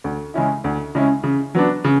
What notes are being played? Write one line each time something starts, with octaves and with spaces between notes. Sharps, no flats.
D2
C#3 G#3 C#4 E4
D2
C#3 G#3 C#4 E4
C#3
F#3 B3 D4
C#3